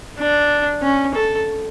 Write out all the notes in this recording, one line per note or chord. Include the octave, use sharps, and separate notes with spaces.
D4
C#4
A4